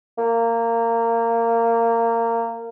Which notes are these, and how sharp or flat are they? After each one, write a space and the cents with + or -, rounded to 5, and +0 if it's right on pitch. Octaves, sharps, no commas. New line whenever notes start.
A#3 -20